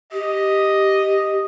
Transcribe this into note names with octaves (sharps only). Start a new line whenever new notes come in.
G4 D#5